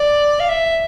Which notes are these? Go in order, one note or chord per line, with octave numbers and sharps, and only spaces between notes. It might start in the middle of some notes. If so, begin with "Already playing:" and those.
Already playing: D5
F5
E5